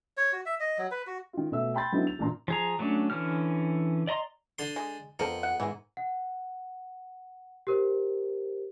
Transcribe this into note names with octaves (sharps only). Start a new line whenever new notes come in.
C#5
F#4
E5
D#5
F#3
B4
F#4
D#3 F4
B2 A3 E5 E6
G5 A5 B5 C6 G6 A6
D3 F#3 B3 C4 D#4 E4
F7
A1 A#2 D4 A#5 C6
F3 G#4 A#5
F#3 A3 C#4 D4
D3 E3 C#4 F6
D5 D#5 A#5 C6
D3 C6
G#3
F2 B3 A4 A#4 C5
F#5
G#2 D#3 E3 G#3
F#5
G4 A#4 C5